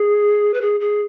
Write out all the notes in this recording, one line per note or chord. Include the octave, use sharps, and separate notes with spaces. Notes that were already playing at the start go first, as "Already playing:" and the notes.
Already playing: G#4
B4
G#4
G#4